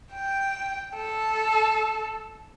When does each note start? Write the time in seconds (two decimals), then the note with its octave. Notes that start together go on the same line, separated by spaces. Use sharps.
0.13 G5
0.96 A4